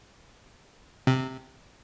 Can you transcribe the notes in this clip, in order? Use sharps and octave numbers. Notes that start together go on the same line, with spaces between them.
C3